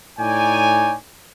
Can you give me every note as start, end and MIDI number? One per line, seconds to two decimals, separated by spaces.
0.19 0.94 45
0.19 0.94 63
0.19 0.94 73
0.19 0.94 74
0.19 0.94 79
0.19 0.94 80